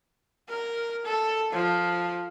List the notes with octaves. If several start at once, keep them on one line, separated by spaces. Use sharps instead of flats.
A#4
A4
F3